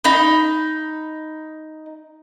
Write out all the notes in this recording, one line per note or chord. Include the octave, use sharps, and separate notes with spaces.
D#4 B5